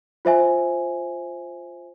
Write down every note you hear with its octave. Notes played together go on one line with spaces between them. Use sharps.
F4 C5 E5 G#5